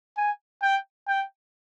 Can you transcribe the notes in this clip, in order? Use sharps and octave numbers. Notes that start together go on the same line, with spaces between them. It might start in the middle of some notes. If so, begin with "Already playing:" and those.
G#5
G5
G5